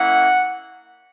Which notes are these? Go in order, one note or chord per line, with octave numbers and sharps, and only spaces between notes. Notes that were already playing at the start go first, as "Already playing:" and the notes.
Already playing: A#3 C#4 E4 F#5